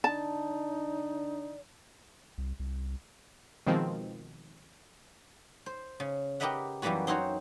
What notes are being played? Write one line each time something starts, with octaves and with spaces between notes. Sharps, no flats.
D3 D#4 D5 A5
C2
C2
B2 D#3 F3 G#3 C4
C5
C#3
G4 A#4 B4 D#5 E5 F#5
F#2 E3 G3 A#3 B3 F#4
C4 D#4 F#4 C5 C#5